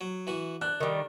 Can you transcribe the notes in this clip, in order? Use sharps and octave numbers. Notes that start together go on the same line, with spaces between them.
F#3
E3 F#4
D4 F#6
D#3 G3